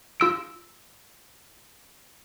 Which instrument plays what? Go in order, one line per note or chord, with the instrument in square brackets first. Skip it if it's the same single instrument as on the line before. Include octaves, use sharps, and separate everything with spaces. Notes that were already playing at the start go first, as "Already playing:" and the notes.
[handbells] F4 E6 D7